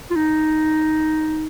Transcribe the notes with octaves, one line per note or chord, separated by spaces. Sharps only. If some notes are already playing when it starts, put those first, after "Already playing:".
F4
D#4